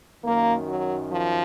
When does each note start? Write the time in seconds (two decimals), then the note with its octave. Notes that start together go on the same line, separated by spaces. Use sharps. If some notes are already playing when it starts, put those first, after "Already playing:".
0.24 F#2 D#3 A#3
0.67 F#3
1.10 F3